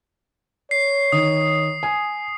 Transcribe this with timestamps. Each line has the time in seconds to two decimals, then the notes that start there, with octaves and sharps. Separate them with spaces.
0.71 C#5 C7
1.12 D#3 D#6
1.83 G#5